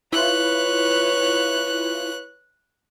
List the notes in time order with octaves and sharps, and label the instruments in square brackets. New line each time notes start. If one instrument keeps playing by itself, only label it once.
[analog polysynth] E4 F4 [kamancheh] B4 C#5 [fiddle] F#6